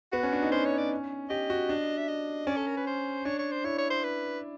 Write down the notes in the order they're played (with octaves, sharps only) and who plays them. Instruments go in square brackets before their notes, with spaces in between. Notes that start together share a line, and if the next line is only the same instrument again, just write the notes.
[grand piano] B3 [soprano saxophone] F#4
[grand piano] C#4
D4
D#4
[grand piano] C#4 [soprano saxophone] C5
[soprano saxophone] C#5
D5
[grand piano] G4 [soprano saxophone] D#5
[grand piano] F#4
D4
[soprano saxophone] E5
D#5
[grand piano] C#4 [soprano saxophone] D5
[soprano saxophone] A4
A#4
B4
C5
[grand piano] D4 [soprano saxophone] C#5
[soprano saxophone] C#5
C5
[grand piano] E4 [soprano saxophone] C#5
[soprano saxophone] C#5
C5
B4